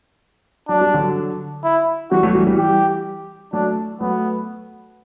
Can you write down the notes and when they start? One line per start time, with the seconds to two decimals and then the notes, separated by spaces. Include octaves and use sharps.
0.69 F#3 D4
0.81 G3
0.94 D3 F#3
1.64 E4
2.11 E3 G3 F#4
2.23 F#3 A3
2.35 E3 G3
2.47 E3 G3
2.58 G4
3.53 F#3 A3 D4
4.00 F#3 A3 B3